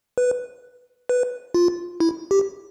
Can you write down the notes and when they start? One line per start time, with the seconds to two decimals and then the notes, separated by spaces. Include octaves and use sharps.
0.18 B4
1.09 B4
1.54 F4
2.00 E4
2.31 G4